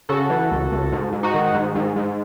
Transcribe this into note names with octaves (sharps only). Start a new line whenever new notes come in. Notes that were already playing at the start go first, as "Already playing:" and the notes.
C#3 F#4 A4
E3
C#2
C#2
G#2
G#2
D#4 F#4
D#3
G#2
G#2
G#2